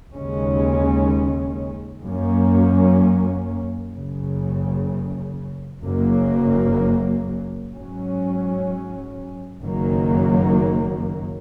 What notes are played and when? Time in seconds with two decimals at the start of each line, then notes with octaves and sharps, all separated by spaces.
0.14 D#2 C#3 G#3 C#4
2.03 F#2 F#3 A#3 C#4
3.94 F#1 F#2 C#3
5.83 F#1 F#2 F#3 A#3
7.73 G#2 F#3 C#4
9.62 F#1 F#2 D#3 F#3 A#3